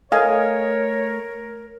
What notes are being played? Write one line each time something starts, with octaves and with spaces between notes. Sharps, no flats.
A3 A#4 C#5 D#5 F5 G#5